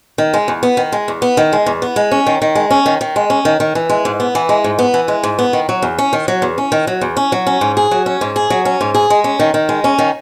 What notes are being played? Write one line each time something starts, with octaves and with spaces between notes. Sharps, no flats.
D#3
G#3
E2
B3
D#3
G#3
E2
B3
D#3
G#3
E2
B3
G#3
C#4
D#3
D#3
G#3
C#4
D#3
D#3
G#3
C#4
D#3
D#3
E3
G#3
G#2
B3
E3
G#3
G#2
B3
E3
G#3
G#2
B3
D#3
F#3
E2
C#4
D#3
F#3
E2
C#4
D#3
F#3
E2
C#4
F#3
C#4
G#2
G#4
F#3
C#4
G#2
G#4
F#3
C#4
G#2
G#4
G#3
C#4
D#3
D#3
G#3
C#4
D#3